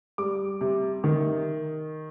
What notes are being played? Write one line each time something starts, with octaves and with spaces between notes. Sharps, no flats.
G3 D6
C3
D#3